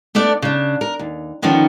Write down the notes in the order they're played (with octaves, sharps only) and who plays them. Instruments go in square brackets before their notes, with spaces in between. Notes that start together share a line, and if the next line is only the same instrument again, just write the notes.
[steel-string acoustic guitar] A3 B3 D4 D5
C#3 D4
A#4
D#2
D3 D#3 F3 B3 C#4 D#4